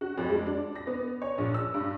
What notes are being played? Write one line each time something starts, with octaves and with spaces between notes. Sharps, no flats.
F#4
F2
G#3
D4
A#6
B3
C#5
A#1
E6
G2